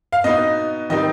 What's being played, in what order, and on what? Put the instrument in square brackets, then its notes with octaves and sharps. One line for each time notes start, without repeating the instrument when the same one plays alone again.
[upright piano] F5
B2 B3 D#4 D#5
D#3 G3 C4 D#4 D#5